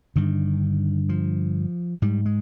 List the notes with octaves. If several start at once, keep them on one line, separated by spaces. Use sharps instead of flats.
G2 D3 D#3
F3
G#2 G3
G#3